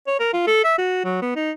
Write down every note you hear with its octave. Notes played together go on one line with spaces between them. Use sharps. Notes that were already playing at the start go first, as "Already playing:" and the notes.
C#5
A#4
F4
A4
E5
F#4
F#3
B3
D#4